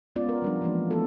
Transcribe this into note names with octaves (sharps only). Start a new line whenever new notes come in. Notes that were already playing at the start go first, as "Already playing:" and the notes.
G#3 B3 C#4 F4 D5
A#4
F3 G3 D4
E3 F3 G#3 A#3 D4
A3 B3 C#4 E4 F#4 A4